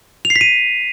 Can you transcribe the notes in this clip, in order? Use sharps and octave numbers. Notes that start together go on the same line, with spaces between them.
F7
C7
B6
D#7